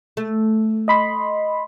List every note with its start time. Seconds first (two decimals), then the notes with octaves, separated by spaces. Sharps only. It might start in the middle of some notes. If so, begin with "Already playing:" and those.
0.17 A3
0.88 D#5 B5 C6